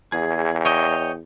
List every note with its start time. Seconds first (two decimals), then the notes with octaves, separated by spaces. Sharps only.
0.12 E2 G#4
0.65 C#5 D#5 G5